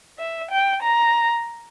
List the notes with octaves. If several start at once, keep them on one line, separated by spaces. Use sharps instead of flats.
E5
G5
A#5